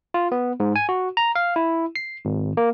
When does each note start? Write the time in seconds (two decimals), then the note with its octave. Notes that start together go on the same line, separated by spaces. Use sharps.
0.14 F4
0.32 B3
0.60 G#2
0.76 G#5
0.89 F#4
1.17 A#5
1.35 F5
1.56 E4
1.96 C7
2.25 G#1
2.57 A#3